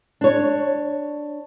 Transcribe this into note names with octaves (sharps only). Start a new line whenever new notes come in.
D4 C#5